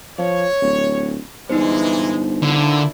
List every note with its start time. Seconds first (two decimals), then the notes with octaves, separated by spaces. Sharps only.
0.18 F3 C#5
0.62 D1
1.50 G1 A#2 E3 G#3 D#4 C5
2.43 A#2 D3 D4 E4